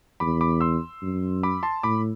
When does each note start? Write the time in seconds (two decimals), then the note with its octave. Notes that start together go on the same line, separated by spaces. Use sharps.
0.20 E2 B5 D6
0.41 B5 D6
0.61 C6 E6
1.02 F#2
1.43 B5 D6
1.63 A5 C6
1.83 A2 B5 D6